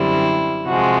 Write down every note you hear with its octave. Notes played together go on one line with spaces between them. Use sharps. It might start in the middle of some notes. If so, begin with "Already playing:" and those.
Already playing: F#2 D3 G3 C4 E4
C3 F3 G#3 F#4